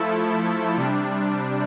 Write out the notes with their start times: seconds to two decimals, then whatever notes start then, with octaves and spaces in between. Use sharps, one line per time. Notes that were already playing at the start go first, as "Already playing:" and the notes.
Already playing: F3 A3 E4 A4
0.76 C3 G3 D4